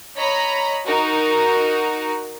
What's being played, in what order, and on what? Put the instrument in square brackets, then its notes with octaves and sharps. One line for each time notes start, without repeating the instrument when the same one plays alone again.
[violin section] C#5 D#5 A#5 B5 B6
D#4 F#4 A#4